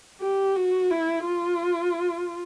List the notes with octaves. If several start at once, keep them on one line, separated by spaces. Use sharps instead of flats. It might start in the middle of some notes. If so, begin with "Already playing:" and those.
G4
F#4
E4
F4